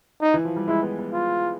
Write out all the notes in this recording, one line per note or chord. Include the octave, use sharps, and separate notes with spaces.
D#4
E3
F3
G3
G#3 E4
B3
B3
F4